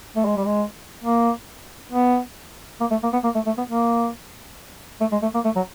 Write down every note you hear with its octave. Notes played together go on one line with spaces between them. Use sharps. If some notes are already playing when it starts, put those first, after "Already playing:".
A3
G#3
G3
G#3
A#3
B3
A#3
A3
A#3
B3
A#3
A3
A3
B3
A#3
A3
G#3
A3
A#3
A3
F#3